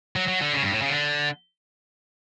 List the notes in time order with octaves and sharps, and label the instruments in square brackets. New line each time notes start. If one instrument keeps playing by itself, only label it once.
[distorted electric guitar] F#3
F#3
D3
C#3
G2
A2
C#3
D3